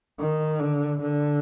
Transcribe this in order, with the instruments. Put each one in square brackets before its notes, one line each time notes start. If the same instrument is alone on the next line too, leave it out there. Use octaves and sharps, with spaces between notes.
[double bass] D#3
D3
D3